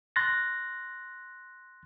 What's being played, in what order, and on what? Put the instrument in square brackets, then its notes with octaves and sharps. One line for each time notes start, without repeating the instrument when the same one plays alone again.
[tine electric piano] C6 F#6 A6 A#6